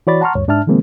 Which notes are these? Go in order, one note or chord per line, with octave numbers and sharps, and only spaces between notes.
E3 F#4 C#5 D5 B5 A6
F#5 A5 A#5 C6 C#6 F6
D2 G2 C#5
G#2 D4 E5 A5 F6
C3 D#3 F3 G#3 A#3 C4